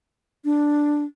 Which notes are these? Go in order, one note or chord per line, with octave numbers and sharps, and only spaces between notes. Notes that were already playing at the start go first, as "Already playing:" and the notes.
D4